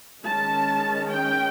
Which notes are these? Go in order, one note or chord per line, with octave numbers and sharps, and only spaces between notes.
D#3 G#3 C#4 A5
G5